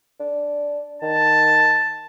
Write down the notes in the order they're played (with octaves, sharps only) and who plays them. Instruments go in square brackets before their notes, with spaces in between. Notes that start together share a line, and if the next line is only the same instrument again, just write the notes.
[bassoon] D4
[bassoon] D#3 [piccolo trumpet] A5